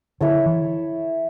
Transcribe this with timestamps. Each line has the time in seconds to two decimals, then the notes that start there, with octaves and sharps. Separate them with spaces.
0.21 D3 E4 A4 C#5
0.46 E3